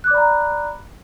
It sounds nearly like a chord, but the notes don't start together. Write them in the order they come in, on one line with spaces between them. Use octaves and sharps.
F#6 D6 D5 B5 A#5